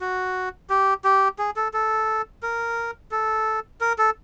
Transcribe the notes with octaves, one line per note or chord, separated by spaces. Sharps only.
F#4
G4
G4
G#4
A4
A4
A#4
A4
A#4
A4